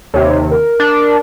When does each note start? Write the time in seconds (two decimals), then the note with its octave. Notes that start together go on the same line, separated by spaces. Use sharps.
0.14 D#2 C3 C#5
0.51 A#4
0.80 D4